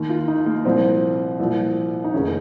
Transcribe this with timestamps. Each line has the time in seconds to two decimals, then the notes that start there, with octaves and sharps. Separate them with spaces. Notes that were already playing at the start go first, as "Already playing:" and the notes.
Already playing: D#2 D#3
0.09 F4
0.28 D#4
0.46 A#3
0.65 C2 A#2 F3 C4
1.40 C2 A#2 F3
2.04 D#4
2.13 F1 D#2 C#3 C#4